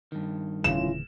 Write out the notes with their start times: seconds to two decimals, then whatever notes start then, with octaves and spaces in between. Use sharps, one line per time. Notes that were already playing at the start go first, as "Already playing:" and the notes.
0.12 G2 D#3
0.64 D1 C#3 E3 C#4 E4 F4 E7